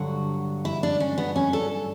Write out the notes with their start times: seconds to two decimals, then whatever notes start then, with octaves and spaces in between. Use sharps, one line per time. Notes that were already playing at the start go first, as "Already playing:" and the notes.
Already playing: G2 D3 F#3 F#4
0.65 E4
0.83 D4
1.00 C#4
1.18 B3
1.36 C#4
1.53 A4